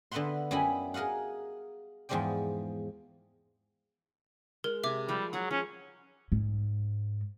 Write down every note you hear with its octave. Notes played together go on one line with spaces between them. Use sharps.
D3 B3 B4 E5 F#5 C6
F#2 G3 E4 D#5 G#5 B5
G#4 A#4 D#5 F5 F#5
E2 G#2 F3 G#3 D5 G5
G#3 A#4
C3 E5 G#5 D6
F3 G3 B5
F#3 G#4 F#5
F3 C#4
G#2